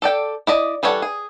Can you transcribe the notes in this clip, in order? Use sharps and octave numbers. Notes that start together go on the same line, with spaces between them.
A4 D5 G5
E4 D5 D#5
E3 G3 A4 C#5 F#5
G#4